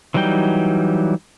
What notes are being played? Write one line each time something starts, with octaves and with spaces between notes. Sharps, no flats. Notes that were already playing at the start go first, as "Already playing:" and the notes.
E3 F#3 G3 D#4 G5